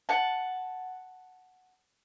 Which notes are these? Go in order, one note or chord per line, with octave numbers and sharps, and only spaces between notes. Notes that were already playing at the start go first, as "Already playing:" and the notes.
F#5 A5